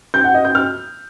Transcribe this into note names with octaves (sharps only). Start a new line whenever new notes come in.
G6
F#5
D#5
G6
F6